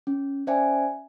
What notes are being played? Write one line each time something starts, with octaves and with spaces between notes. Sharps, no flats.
C#4
C#4 C5 D5 E5 G5 G#5